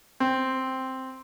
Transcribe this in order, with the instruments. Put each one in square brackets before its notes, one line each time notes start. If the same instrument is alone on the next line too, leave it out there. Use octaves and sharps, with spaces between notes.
[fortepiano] C4